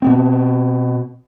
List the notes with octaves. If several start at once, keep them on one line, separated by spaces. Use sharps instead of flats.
B2 B3 C4